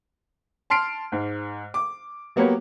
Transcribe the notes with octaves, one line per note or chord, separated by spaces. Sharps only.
A5 C6 F6 C7 D7
G#2
D6
F#3 A#3 B3 G4 C#5